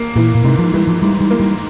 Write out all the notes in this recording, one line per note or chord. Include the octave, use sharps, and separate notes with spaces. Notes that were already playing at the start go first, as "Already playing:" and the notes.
Already playing: A#3
A#2 E3
A#2
G#2 C3
F3
E3 G3
F3
G#2 G3
G3
A#3
G3